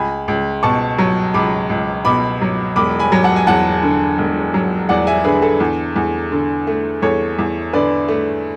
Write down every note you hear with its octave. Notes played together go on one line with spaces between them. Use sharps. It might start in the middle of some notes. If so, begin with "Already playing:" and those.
Already playing: C#2 G#5 B5
C#2
B2 A5 C#6
F#3
C#2 B5 D6
C#2
B2 B5 D6
F#3
E1 B5 D6
G#5 B5
F#3
F#5 A5
G#5
E2 F#5 A5
D3
E1
F#3
E2 D5 F#5
E5 G#5
D3 G#4 B4
A4
E2
E2
D3
A3
E2 A4 C#5
E2
D3 B4 D5
A3